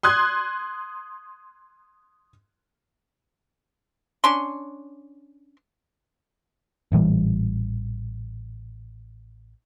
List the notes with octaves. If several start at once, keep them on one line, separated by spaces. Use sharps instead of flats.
C6 D#6 F#6 G#6
C#4 D4 C6
A1 A#2 E3 G3